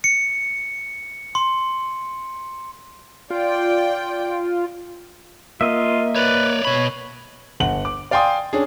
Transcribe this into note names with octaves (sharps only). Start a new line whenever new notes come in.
C#7
C6
F4 D5 G5
A#3 F4 D#5 E5
B4 C#5 D5
B2 C#5 B5
G1 F#5 F#7
D6
D5 F5 G5 G#5 C6 D#6
C#4 D4 G#4